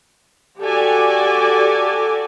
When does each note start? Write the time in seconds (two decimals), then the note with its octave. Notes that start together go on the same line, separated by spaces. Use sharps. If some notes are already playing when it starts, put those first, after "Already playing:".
0.62 F#4 G4 A4 D5 G#5